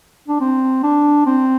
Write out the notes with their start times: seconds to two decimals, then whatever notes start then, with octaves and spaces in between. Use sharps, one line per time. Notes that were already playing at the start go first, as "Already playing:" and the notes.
0.28 D4
0.40 C4
0.83 D4
1.26 C4